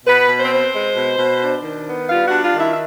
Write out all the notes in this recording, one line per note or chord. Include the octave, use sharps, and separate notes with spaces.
B2 B3 B4
B2
C4 C5
C4
G#3
B2
B2
D4
D#3
B3
G3 F4 F5
F#4 F#5
D4
F4 F5
D#3
E4 E5
E5